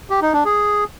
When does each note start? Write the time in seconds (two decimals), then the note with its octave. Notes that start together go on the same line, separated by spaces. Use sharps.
0.10 G4
0.22 D#4
0.33 D4
0.45 G#4